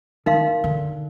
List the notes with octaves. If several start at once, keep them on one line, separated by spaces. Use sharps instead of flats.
D#3 D#4 A#4 F5 C6
D3